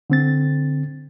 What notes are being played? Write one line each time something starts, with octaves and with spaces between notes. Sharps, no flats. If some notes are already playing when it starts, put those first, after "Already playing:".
D3 C4 A6